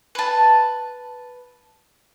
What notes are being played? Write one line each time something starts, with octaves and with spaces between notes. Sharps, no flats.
B4 A5